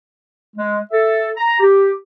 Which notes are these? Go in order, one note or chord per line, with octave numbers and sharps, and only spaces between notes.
G#3
A4 E5
A#5
G4